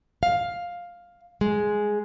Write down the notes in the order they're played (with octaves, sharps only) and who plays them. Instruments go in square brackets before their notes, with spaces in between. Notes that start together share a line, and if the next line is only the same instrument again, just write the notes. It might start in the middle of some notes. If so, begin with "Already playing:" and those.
[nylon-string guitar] F5
G#3